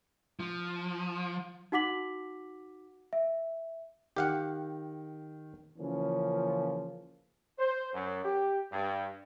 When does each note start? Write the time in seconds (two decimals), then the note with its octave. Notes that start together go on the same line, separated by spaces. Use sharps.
0.40 F3
1.72 D#4 F#4 F#5 D6 B6 F#7
3.13 E5
4.16 D#3 G4 F5 F#5
5.78 C#3 E3 F3 A#3 C#4
7.59 C5
7.94 F#2
8.24 G4
8.72 G2